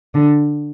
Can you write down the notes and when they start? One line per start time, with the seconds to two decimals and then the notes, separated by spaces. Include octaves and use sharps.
0.15 D3